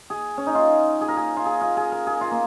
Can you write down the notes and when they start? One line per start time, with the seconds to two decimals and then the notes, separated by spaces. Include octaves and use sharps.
0.10 G#4
0.38 C#4
0.47 D#4
0.55 F4
1.01 G#4
1.08 A#4
1.17 G#4
1.37 F4
1.46 G#4
1.61 F4
1.77 G#4
1.92 A#4
2.07 G#4
2.21 F4
2.31 A#3